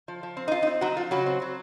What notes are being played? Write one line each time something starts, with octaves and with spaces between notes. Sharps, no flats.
F3
F3
C4
D#4
C4 F4
D#4
C4
F#3 D#4 F#4
F3 F4
C#3 F#3 F#4
C4
F#3